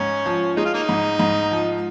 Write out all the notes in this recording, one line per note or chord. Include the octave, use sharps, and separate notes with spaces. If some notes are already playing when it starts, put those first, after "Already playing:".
Already playing: G#2 C#4
F3
G#3 D#4
F4
A#3 D#4
G#2
G#2
F3